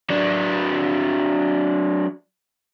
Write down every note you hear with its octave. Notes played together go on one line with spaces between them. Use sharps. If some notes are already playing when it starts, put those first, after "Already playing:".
F#3 D4